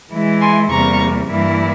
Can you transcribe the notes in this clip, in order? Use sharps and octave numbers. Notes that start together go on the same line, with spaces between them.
E3 G#3 E4
G#5 C6
E2 C3 G3 A#3 A#5 C#6
G2 E3 G3 A#3 E4